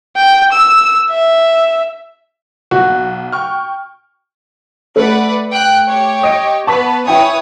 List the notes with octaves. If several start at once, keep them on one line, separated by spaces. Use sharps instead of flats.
G5
E6
E5
B1 F#4
G5 C#6 F6
A3 B4 D5 F#5
G5 F#6
G4 C#5
D#5 D7
B3 B4 A5 C#6 B6
E4 B4 C#5 G5 G#5 D#6